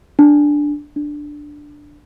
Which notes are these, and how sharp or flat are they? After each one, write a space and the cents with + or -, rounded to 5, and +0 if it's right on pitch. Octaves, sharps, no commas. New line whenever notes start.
D4 +0
D4 +5